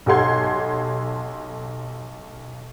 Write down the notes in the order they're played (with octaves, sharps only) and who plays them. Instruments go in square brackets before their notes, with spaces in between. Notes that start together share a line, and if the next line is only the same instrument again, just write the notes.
[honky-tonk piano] B1 G4 A4 F#5 C6 G#6